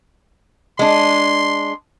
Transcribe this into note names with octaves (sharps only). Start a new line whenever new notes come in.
G#3 D4 C6